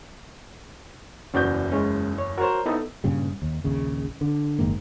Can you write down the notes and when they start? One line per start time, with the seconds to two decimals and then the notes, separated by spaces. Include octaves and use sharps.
1.34 F#1 E2 C#4 F#4 D5 G6
1.72 G#3 C#4
2.18 C#5
2.38 F#4 A#4 C5 C#5
2.66 B3 D#4 E4 A4
3.04 G2 A#2 C#3 G3
3.42 D#2
3.64 A#1 D#2 C#3
4.21 D3
4.59 F#1 G#2 D#3 A#3